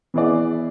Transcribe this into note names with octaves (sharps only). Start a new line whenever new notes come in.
E3 B3 E4 G#4 D5